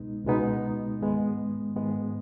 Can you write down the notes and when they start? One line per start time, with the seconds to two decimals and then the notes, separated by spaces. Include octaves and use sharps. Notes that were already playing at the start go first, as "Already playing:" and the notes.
Already playing: C#2 B2 G#3 B3 D#4
0.25 C#2 B2 G#3 B3 D#4
1.00 G#2 D#3 G#3 B3
1.76 G#2 D#3 G#3 B3